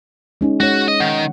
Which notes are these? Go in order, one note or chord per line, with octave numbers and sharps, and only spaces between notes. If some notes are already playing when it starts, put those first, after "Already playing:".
G#3 C#4 D#4
G#3 F#4 C#5
D#5
D#3 F#5